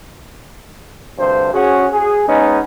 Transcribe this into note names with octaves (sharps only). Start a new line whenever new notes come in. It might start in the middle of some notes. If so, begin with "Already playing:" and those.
D2 G2 C3 C5
C#4 F#4 G#4
G#4
G#3 B3 C#4 D#4